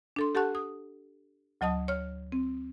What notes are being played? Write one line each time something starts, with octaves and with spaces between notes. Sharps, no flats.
D4 A4 C6
G4 A4 F#5 A5 C#6 F#6
D#6
D2 F#3 D#5 A5 D#6
C#5 F6
C4